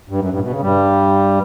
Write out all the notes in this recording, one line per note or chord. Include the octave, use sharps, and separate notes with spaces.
G2
F#2
G2
A2
B2
C#3
G2 G3